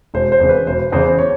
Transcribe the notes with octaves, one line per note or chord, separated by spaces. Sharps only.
E1 C5
C5
E2 C#3
B4
E1 C5
E2 C#3 C5
C#5